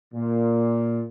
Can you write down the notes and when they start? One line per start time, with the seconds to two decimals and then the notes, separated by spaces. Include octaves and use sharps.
0.14 A#2